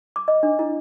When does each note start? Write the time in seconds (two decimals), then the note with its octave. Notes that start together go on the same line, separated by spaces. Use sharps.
0.16 D6
0.28 D#5
0.43 D4
0.59 E4